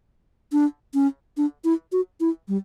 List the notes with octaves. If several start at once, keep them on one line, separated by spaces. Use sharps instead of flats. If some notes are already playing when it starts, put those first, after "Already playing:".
D4
C#4
D4
E4
F#4
E4
G3